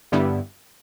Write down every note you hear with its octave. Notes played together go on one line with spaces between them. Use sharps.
G2 D3 G3 B3 E4